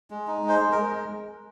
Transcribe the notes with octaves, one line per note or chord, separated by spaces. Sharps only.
G#3
D#4
G#3
C5
G#3
A#4
G#3